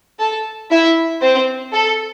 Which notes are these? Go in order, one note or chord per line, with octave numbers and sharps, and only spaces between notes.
A4 A5
E4 E5
C4 C5
A4